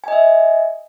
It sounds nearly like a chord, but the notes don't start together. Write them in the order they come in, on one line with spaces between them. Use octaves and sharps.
G#5 D#5 E5